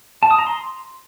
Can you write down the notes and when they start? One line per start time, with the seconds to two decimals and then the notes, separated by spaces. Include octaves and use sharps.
0.23 A5
0.31 D#6
0.39 A#5
0.47 C6